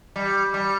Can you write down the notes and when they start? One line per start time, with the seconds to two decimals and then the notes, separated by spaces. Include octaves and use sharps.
0.16 G3
0.54 G3